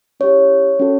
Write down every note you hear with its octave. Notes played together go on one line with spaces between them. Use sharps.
C#4 E4 G4 C#5
C#4 F#4 A4